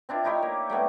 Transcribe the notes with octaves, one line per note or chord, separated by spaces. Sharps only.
C4 D4 E4 F4
D#4 E4 G4 C#5
A#3
G3 A3 B3 C4